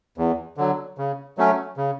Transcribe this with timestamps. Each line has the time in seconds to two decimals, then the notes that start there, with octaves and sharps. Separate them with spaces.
0.18 E2
0.57 D3 F#3
0.98 C#3
1.38 F#3 A3 C#4
1.77 C#3